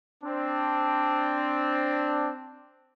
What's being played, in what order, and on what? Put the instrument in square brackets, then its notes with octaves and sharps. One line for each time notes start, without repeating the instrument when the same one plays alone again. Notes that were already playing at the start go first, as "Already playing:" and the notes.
[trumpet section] C4 D4